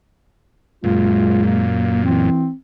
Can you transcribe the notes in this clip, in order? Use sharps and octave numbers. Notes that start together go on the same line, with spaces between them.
F#2 A#2 G#3 F4
A#3
E3 C4